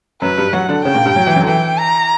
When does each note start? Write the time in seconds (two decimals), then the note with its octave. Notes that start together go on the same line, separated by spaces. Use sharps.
0.22 F#2 F#3 B4
0.38 G2 G3
0.53 F#3 F#4 F#5
0.69 D3 D4
0.84 C#3 C#4 G5
0.95 A#2 A#3
1.05 G2 G3
1.16 F#3
1.27 E3
1.35 F#2 F#3
1.42 D3
1.47 E3 G5
1.79 A#5